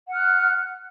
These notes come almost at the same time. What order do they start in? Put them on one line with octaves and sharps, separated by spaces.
F#5 F6 F#6